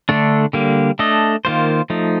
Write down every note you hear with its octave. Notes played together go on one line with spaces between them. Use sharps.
D3 A3 D4
D3 G3 A#3
A3 D4 A4 D#5
D#3 A#3 F4 C5
F3 A3 D#4